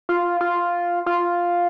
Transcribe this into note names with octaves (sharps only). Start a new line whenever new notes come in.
F4
F4
F4